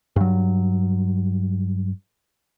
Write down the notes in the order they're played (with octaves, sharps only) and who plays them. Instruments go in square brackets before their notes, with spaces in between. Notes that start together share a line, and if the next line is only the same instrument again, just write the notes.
[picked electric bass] G2 F#3